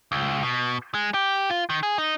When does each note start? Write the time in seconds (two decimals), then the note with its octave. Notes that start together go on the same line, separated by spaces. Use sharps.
0.12 C#2
0.43 B2
0.94 G#3
1.14 G4
1.50 F4
1.70 D#3
1.83 G#4
1.98 D#4